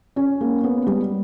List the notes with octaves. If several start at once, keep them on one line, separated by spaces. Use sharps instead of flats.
C#4
A#3
B3
G3